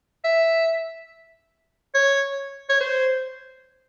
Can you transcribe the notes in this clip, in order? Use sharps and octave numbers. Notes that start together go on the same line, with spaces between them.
E5
C#5
C#5
C5